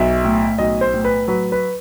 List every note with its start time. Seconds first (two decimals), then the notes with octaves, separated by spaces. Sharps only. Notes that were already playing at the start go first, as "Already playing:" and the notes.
Already playing: B1 E5
0.24 A2
0.58 B1 D#5
0.81 C5
0.93 A2
1.05 B4
1.28 F#3 B4
1.52 B4